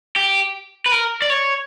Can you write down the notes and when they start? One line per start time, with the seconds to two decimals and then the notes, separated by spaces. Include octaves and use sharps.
0.16 G4
0.86 B4
0.92 A#4
1.22 D5
1.30 C#5